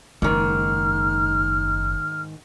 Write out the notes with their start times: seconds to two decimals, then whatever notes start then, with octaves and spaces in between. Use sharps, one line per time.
0.22 F#1 G#2 D#3 F6